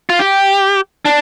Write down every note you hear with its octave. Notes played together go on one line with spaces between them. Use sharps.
F4
G4
D4